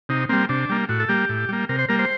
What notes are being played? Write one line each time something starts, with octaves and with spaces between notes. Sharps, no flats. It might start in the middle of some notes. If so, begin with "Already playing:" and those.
C3 D#4
G3 A#3 C4
C3 D4
G3 A#3
A2 F#4
A4
G3 A#3 G4
A2
G3 A#3
C3 A#4
C5
G3 A#3 A#4
C5